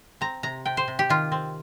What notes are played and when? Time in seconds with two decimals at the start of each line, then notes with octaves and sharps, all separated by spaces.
0.21 C4 A#5
0.43 C3 A#5
0.65 C3 G5
0.77 C5
0.88 C3
0.99 G4
1.09 D#3 F4
1.32 C4